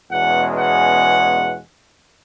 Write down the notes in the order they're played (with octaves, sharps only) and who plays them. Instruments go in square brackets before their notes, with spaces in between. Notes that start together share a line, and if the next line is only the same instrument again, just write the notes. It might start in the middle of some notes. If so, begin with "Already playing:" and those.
[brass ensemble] E2 B2 G#3 C#4 F#5
F#5